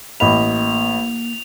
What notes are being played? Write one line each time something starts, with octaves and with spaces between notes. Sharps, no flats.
A1 A#3 D#5 B5 F7